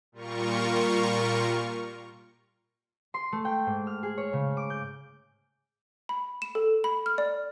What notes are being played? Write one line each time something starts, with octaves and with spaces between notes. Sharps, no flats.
A#2 G3 F4 A#4 C#6
C6
A3
G5
G#2
F6
G#4
C#5
C#3
D6
G6
B5
E7
A4
B5
F6
D5